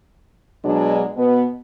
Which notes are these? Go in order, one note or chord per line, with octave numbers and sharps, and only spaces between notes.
B2 F#3 G#3 D4
B2 B3